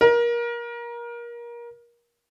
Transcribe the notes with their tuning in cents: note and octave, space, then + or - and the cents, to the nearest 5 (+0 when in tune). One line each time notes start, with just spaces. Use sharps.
A#4 +25